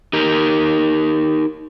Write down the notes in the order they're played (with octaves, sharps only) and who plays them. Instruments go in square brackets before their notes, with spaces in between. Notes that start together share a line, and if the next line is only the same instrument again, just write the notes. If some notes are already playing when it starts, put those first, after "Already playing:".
[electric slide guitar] D#4 G4 A#4